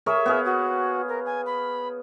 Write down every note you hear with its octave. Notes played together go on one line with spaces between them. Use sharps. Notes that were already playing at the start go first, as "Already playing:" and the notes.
G#4 A#4 C#5 E5
B3 G#4 F5
F#4
A#4
G#5
B5